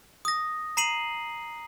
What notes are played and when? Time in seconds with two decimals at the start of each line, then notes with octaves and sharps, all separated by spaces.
0.25 D#6 A#6
0.77 A#5 C7 D#7 F#7